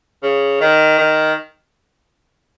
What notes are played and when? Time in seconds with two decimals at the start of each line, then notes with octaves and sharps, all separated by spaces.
0.23 C#3
0.61 D#3
0.98 D#3